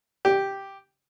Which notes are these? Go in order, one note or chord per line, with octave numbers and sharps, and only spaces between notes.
G4